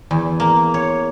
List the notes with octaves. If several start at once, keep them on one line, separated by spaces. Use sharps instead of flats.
E2
A#3
C#5